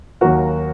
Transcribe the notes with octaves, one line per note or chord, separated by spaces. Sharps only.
D#2 D#3 F#3 A#3 F#4 A#4